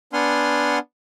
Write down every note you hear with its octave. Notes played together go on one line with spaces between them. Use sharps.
B3 D4 F#5 G#5 C6 F6